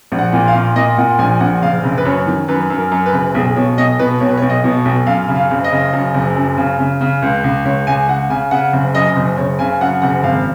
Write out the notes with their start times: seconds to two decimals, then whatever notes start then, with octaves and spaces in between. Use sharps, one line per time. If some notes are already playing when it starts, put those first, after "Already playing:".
0.12 A#1
0.19 F#5
0.33 A#2
0.48 F5
0.54 A#2
0.76 A#2 D#5
0.97 A#2 F#5
1.18 A#1 G#5
1.40 A#1 F#5
1.62 F#1 F5
1.84 F#1
1.98 B4
2.05 F#2 C#5
2.27 D#3
2.48 F#2 B4
2.70 F#2
2.77 A#4
2.92 F#2
3.06 B4
3.13 F#1
3.34 B1 G#4
3.56 B2 C#5
3.77 B1 D#5
3.99 B2 B4
4.20 B1 C#5
4.29 B4
4.37 C#5
4.42 B1
4.50 D#5
4.64 B2
4.85 B1
5.07 F#2 F5
5.28 C#3
5.36 F5
5.51 F#1
5.64 D#5
5.72 C#3
5.93 F#2
6.14 F#1
6.36 F#2
6.58 C#3
6.79 C#3
7.01 C#3
7.22 C#2
7.44 C#2
7.65 C#2 C#5
7.87 C#2 G#5
8.08 C#2 F#5
8.30 C#3 G#5
8.51 C#3 F#5
8.73 F#1
8.95 F#2 D#5
9.16 F#1
9.37 F#1 C#5
9.59 C#3 G#5
9.81 F#2 F#5
10.02 F#1 F#5
10.23 G#1 F5